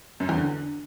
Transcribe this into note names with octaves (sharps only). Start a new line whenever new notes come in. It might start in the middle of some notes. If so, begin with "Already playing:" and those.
F#2
E2
D3